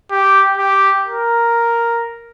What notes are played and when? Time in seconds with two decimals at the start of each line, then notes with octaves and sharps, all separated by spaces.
0.11 G4
0.58 G4
1.04 A#4